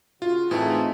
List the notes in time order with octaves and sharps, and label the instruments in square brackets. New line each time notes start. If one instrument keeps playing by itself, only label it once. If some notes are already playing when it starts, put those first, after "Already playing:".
[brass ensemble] C#3 F#4 [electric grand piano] F4
[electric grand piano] A2 [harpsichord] E3 G#4 [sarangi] A3 [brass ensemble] C4 D#4 F4